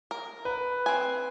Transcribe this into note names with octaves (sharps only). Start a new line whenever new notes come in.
A#4
B4
C4 G#5